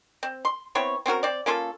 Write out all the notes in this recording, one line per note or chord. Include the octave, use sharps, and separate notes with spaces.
C4
C6
B3 C4 E4 C#5
C4 C#4 F#4 A#4
C4 D5
A#3 C#4 F4 A4